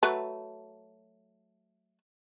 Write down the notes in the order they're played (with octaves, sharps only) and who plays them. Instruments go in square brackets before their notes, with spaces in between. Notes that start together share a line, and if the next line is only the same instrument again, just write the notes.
[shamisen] F#3 A3 B4